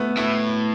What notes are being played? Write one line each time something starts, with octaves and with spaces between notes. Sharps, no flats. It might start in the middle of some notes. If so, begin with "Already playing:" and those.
Already playing: A3 B3
A2 E4